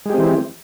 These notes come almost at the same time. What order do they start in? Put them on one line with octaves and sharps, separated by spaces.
G#3 G4 C4 E3